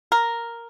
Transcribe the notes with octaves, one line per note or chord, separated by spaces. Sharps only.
A#4